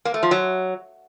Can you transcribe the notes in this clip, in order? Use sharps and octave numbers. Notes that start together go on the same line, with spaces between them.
A#3
A3
F3
F#3